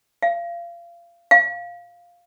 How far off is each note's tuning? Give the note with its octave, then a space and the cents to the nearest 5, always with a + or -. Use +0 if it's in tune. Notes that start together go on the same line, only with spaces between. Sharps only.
F5 -30
F5 +5